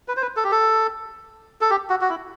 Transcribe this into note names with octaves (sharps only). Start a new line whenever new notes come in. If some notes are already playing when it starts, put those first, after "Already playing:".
B4
C5
B4
A4
G4
A4
A4
G4
F#4
F#4
E4